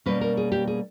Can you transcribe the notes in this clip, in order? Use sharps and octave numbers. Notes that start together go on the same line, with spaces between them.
B2 G3 A#3 C#4 B4
A#4
G#4
G4
G#4